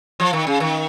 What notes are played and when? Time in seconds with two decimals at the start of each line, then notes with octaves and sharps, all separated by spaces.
0.20 F3
0.33 D#3
0.47 C#3
0.60 D#3